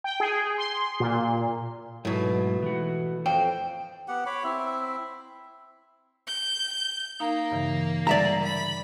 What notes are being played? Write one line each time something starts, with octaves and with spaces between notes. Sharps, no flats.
G5
G#4
C6
A#2
G#2 B2 F#3 A3 E4
E3 F#4
F2 C5 G5
B3 G4 F#5
C#5 B5 D6
C4 E4 E5
G6
A#3 D#4 F5 A#5
G2 C#3 E3
D3 G3 D5 E5 A#5
B5